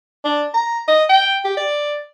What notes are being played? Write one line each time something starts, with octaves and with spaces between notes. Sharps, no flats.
D4
A#5
D#5
G5
G4
D5